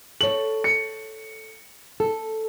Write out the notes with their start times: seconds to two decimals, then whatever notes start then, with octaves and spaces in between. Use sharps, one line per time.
0.21 A4 C#5 F#7
0.64 C#7
2.00 A4